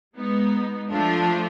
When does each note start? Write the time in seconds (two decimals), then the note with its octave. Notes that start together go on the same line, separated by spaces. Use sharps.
0.15 G#3 B3 D#4
0.91 F3 A3 D4 F4